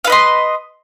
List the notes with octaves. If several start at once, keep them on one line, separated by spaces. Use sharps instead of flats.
B4 D#5 F5 C6